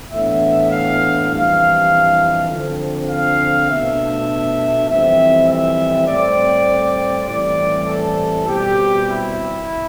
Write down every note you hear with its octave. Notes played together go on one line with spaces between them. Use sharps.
A2 E3 B3 D4 E5
F5
F2 E3 G3 D4 F5
D3 F3 C4
F5
B2 A3 D4 E5
F2 E3 G3 C4 E5
E5
A2 G3 C4 D5
A2 E3 G3 C4 D5
A4
B2 G3 C4 G4
E4